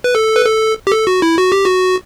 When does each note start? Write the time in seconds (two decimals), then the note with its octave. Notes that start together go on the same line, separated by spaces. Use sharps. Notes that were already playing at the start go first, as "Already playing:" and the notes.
0.04 B4
0.15 A4
0.36 B4
0.46 A4
0.87 G4
0.92 A4
1.07 F#4
1.22 E4
1.38 F#4
1.52 G4
1.65 F#4